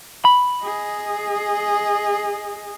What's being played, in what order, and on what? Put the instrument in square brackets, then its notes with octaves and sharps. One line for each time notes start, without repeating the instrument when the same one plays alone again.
[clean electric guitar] B5
[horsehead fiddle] G#4 D#5